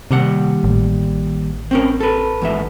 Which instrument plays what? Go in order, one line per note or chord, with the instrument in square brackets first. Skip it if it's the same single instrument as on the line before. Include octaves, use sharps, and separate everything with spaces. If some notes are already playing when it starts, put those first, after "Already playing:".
[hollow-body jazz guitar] D#2 G3 F#5 [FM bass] C3
[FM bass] A1
[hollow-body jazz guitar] C4 C#4 A#4
A4 B4
E2 G#2 E5